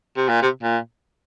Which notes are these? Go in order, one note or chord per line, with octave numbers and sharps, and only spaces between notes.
C3
A#2
C3
A#2